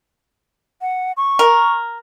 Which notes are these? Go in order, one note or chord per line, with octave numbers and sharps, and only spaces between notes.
F#5
C#6
A#4